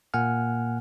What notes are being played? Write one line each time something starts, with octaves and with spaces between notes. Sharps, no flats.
A#2 A#3 F#5 G#5 F6